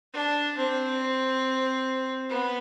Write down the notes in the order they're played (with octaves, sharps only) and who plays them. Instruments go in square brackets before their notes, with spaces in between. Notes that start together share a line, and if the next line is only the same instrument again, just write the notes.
[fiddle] D4
C4
B3